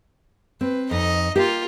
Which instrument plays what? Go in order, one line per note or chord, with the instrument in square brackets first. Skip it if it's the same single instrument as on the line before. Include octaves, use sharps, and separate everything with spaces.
[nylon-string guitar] C4 [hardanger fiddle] B4
[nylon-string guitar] F2 [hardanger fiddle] D#4 D#5
[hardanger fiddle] A#3 F4 [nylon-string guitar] G4